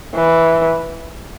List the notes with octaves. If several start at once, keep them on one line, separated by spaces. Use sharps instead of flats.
E3